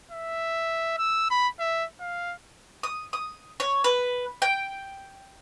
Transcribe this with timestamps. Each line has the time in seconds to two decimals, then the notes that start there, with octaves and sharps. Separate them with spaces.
0.12 E5
0.98 E6
1.31 B5
1.60 E5
2.01 F5
2.83 D#6
3.13 D#6
3.60 C#5
3.84 B4
4.42 G5